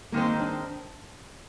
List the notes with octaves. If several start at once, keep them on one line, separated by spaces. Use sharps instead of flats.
G#2 D#3 G#3 A#3 C4
D4